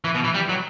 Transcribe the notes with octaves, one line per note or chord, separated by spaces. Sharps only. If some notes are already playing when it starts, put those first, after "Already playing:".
E3
B2
E3
G3
F#3